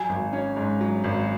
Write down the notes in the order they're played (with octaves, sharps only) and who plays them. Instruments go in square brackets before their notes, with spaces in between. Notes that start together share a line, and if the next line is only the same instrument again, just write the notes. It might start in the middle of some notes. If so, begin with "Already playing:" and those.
Already playing: [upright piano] F#3 [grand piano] G#5
[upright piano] G#1
C#4
G#2
F#3
G#1